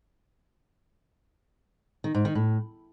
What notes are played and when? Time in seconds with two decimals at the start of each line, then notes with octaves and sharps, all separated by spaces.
2.04 D#3
2.15 G#2
2.25 D#3
2.35 A2